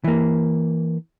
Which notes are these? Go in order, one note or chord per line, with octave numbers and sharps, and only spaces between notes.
E3 A#3